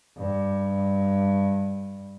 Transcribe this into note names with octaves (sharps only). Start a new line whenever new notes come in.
G2